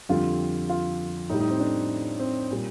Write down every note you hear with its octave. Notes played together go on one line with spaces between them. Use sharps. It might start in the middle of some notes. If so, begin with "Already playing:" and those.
F2 D3 G3 F4
F4
A2 G3 D#4
D#4
C4
D4
C4
A#2 G3